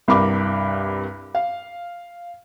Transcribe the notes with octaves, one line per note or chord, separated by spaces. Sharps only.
C2 G2 A#4 B5 D6
F5